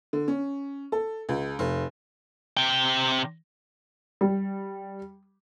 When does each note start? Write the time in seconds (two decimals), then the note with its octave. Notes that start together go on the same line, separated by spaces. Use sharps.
0.13 D3
0.28 C#4
0.92 A4
1.29 C#2
1.59 F1
2.57 C3 G5
4.21 G3